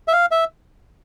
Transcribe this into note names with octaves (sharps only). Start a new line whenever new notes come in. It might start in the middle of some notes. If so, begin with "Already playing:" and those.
E5
F5
E5